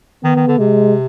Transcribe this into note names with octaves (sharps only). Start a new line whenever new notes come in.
D#3 B3
D#3
D3
C3 G#3